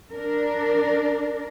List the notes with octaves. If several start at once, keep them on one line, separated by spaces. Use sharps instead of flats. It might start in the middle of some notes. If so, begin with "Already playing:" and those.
D4 A#4